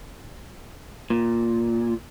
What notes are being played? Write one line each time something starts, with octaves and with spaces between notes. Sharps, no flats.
A#2